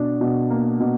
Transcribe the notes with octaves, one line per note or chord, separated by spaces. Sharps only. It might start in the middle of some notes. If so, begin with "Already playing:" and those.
Already playing: B2 D4
B2
A#3
B2